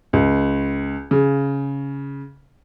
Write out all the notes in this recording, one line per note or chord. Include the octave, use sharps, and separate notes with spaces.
C#2
C#3